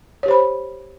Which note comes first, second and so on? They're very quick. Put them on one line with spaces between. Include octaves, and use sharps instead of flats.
C#5 G4 C5 B5